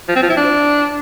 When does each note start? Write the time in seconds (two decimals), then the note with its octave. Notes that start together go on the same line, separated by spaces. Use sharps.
0.09 F3
0.16 C4
0.23 F3
0.30 E4
0.37 D4